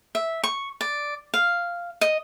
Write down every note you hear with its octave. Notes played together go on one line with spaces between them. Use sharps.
E5
C#6
D5
F5
D#5